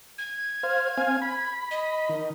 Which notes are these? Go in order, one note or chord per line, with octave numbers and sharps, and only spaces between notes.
G#6
C5 F5
C4 F5 G#5
B5
D#5
D#3